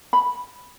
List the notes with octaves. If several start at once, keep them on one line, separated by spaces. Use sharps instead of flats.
B5